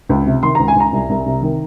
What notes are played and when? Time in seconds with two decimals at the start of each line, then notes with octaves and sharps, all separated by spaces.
0.09 C#2
0.26 C3
0.43 D#3 C6
0.55 C#2 A#5
0.68 G#5
0.76 C#2 A#5
0.92 C2
1.10 C2
1.26 C3
1.42 D#3